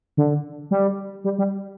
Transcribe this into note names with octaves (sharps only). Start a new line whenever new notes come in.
D3
G3
G3
G3